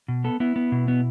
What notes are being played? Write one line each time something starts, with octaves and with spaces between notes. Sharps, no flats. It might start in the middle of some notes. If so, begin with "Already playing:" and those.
B2
B3 A4
B3 E4
B3
B2
B3